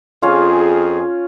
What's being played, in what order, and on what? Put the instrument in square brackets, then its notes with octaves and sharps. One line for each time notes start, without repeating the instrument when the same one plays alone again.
[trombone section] F2 G#4 [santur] C#4 F4